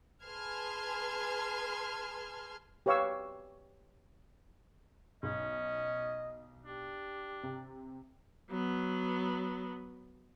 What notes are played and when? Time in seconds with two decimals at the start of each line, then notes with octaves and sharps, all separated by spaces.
0.24 G#4 B4 A5 C6 F6 G#6
2.86 G4 B4 C#5 F5 C#6 E6
5.23 B1 C#4 D#5
6.66 D4 G4
7.43 C3
8.50 F#3 B3